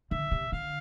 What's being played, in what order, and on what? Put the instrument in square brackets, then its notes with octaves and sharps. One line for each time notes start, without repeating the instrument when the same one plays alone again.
[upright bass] D3 [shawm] E5
[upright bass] C3
[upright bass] D3 [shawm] F5